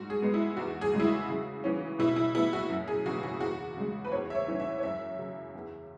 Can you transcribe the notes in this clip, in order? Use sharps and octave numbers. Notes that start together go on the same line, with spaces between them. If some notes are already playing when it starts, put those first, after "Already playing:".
Already playing: G#2 F#4
G#4
G#3 B3
E4
E2 F#4
G#4
C#3 G#3
E4
F#4
C#3
E3 C#4
B2 E4
E4
B3 E4
F#4
F#2
G#4
C#3 E3 F#4
F#4
E2 F#4
C#3 G#3
B4
E2 C#5
E5
C#5
E3 C#4
E5
C#5
F#2 E5
C#3 F#3
E2